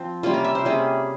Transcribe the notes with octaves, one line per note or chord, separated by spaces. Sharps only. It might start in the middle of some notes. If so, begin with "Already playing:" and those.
Already playing: F3 C4
C3 G3 A#3 C#4 F4
A#4
E5
C5
C3 G3 A#3 C#4 G#4